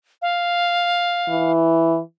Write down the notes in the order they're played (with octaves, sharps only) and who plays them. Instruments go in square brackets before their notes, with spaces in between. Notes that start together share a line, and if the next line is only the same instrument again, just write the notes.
[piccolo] F5
[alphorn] E3